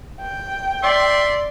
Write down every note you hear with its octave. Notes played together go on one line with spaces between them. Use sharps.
G5
D5 E5 C6